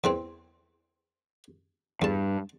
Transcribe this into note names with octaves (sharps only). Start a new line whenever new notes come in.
E2 E3 C4
E2 G2 A5